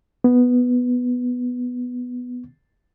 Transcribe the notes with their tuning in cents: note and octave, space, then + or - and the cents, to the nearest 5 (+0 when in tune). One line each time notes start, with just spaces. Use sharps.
B3 +0